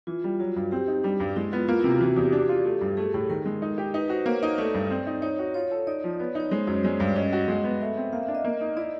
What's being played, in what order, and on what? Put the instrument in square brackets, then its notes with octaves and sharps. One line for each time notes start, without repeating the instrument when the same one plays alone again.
[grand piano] E3 [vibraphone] F4
[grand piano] G3
[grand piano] F#3 [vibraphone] F#4
[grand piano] G2
[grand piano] C4 [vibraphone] G4
[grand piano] D#4
[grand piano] G3 [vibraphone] D4
[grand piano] G2
[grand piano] G#3 [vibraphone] E4
[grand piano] B3 [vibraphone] F4
[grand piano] A#3 [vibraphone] F4
[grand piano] C3 [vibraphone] E4
[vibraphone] F#4
[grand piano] E3 [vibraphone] F#4
[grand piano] E2 [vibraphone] G4
[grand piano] D4
F4
A3
G2
[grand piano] A3 [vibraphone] G#4
[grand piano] A2 [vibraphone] A4
[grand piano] D#3 [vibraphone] A#4
[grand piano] G#3
D#4
G4
[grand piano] D#4 [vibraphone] B4
[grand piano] F#4 [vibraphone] C5
[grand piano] A#3 [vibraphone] C#5
[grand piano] D#4
[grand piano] A3 [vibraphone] D5
[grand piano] G2
C4
D#4
[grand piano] D#4 [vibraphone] C#5
[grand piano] F#4
[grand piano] F4 [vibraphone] C#5
[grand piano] A4
[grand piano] D#4 [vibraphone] D5
[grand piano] F3
[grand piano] B3 [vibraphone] C#5
[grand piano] D#4 [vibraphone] C#5
[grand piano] G#3 [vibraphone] C5
[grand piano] F#2 [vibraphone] C#5
[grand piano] G#3 [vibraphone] D5
[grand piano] G2 [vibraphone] D5
[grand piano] C#4 [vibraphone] D#5
[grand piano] F#4
G#3
B3
[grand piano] A3 [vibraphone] E5
[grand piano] C4
[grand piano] A#3 [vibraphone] F5
[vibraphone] E5
[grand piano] D4
[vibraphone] D#5
[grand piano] A#3
D#4
[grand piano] E4 [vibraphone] D5